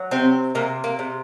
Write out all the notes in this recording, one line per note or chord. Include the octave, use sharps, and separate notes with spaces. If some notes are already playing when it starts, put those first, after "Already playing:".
Already playing: F#3
C3 C4
C3 A#3
A#3
C3